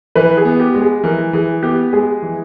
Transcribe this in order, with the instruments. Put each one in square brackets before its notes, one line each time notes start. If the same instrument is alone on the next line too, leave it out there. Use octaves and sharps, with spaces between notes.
[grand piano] E3 [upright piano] B4
[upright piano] G#4
[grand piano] B3
[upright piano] G4
[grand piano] G#3
[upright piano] G#4
[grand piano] E3 [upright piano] A#4
[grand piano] E3 [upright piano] G#4
[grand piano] B3 [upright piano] G4
[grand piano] G#3 [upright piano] G#4
[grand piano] E3